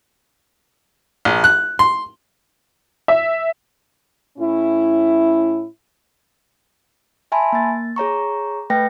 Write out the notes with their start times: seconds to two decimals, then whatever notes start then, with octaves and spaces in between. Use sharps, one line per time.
1.25 A#1
1.44 F#6
1.79 C6
3.08 E5
4.38 A2 C#4 E4
7.32 E5 G#5 A5 B5 C6
7.52 A#3 A6
7.96 G#4 C#5 A#5 C#6
8.70 A3 B4 G5 A#6